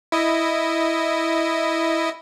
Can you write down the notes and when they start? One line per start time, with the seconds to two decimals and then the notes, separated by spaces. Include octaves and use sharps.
0.12 E4 D#5